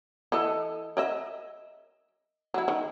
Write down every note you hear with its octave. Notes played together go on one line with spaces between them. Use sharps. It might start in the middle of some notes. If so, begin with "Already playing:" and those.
E3 A4 D#5
A#4 D#5 E5
F#3 E4
D#3